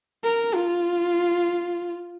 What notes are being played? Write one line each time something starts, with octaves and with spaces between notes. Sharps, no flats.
A#4
F4